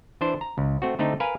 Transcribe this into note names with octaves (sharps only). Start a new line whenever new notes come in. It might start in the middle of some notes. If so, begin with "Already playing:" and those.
E3 D4 C5
A#5
C#2
A3 C4 F#4
D3 A3 C4 D#4
A#4 B4 F5 G#5